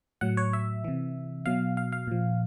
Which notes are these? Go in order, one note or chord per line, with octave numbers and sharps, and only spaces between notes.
A2 F#3 F#5
C#5
E5
C3 E3
B2 F#3 F5
F5
F5
A#2 F3